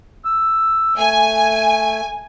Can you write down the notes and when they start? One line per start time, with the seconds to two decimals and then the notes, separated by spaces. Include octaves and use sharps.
0.25 E6
0.97 A3 G#5